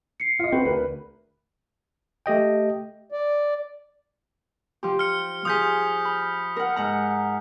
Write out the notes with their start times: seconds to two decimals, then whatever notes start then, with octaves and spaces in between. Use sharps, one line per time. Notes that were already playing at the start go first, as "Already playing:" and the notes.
0.20 C7 C#7
0.39 F4 D#5
0.53 C4 F#4 B4
0.65 D2 A#4 B4
2.26 A3 G4 D#5 G5
3.12 D5
4.83 F3 G4
4.99 F6 C#7
5.45 F3 G#4 D#6 G6 B6
6.05 B5
6.56 A#4 F#5
6.76 G#2 F#5 A#5